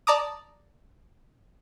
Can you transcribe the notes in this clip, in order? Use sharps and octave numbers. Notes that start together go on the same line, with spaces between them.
D5 A5 A#5 D6 D#6